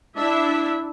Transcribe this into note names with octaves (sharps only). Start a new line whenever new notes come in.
D4 E4 E5